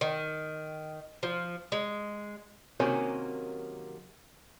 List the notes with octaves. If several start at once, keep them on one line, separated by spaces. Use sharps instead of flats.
D#3
F3
G#3
C3 D#3 F#3 A#3 C#4